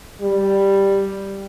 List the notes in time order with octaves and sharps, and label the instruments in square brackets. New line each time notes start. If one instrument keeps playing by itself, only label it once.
[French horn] G3